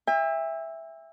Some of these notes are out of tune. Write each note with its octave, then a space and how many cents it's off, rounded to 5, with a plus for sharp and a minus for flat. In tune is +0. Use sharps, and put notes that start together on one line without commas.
E5 +0 G5 +45